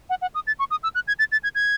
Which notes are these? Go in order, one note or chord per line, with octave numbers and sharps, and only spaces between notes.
F#5
F#5
D#6
A6
C#6
D#6
E6
F#6
G#6
A6
A6
G#6
G#6